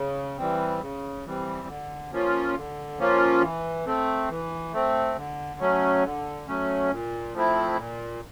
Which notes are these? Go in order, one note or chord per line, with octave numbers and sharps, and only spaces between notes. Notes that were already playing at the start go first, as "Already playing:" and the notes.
Already playing: C#3
E3 G3 C4
C#3
E3 G3 C4
D3
F3 A#3 C#4 F4
D3
F3 A#3 C#4 F4
E3
A3 C4
E3
A3 C4
D3
F#3 A3 C#4
D3
F#3 A3 C#4
A#2
F3 A3 C4 E4
A#2